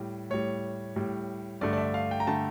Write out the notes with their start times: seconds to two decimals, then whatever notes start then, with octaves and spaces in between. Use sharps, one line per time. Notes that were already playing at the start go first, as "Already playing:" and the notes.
Already playing: A2 G3
0.30 A2 G3 C#5
0.96 A2 G3
1.61 G2 D3 A3 D5
1.73 D5
1.78 E5
1.94 F5
2.11 G5
2.20 A#5
2.27 D3 A3 A5